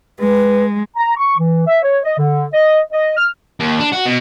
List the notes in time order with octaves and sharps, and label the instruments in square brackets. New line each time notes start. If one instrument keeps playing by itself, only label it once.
[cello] G#3 [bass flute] B4
[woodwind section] A#5
C#6
E3
E5
C#5
D#5
D3
D#5
D#5
F6
[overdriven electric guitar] D#2
D4
F#4
B2